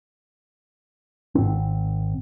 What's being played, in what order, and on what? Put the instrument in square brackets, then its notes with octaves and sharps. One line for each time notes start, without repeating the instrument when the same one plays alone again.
[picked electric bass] G#1 C4